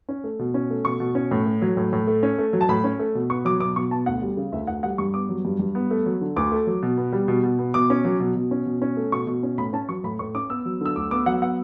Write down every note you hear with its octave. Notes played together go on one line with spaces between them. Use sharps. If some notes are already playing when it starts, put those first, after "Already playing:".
C#4
A3
B2
C#4
A3
B2 C#6
B2
C#4
A2
A3
F#3
A2
A2
A3
C#4
A3
F#3
A5
A2 B5
C#4
A3
B2
B3 C#6
F#3 D6
B2 D6
B2 C#6
B3 A5
D2 F#5
G3
C#3
D2 E5
D2 F#5
G3 F#5
G2 C#6
B3 D6
F#3
G2
G2
B3
A3
F#3
D3
D2 D6
A3
F#3
B2
B3
G3
B2
B2
B3
B2 D6
C#4
F#3
B2
B2
C#4
B2
C#4
A3
B2 C#6
B2
C#4
A2 B5
C#4 A5
F#3 C#6
A2 B5
A2 C#6
C#4 D6
B3 E6
F#3
D3 E6
D2 D6
B3 D6
F#3 F#5
B3 F#5